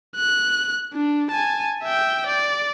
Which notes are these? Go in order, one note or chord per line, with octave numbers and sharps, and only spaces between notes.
F#6
D4
G#5 A5
E5 G5
D5